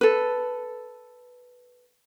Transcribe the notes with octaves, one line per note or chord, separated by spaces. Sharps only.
A4 B4